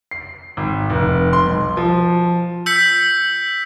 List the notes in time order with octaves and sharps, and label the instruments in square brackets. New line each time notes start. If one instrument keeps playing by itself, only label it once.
[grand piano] C7
G#1
F1
C6
B1
F3
[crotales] E6 G6 B6 C#7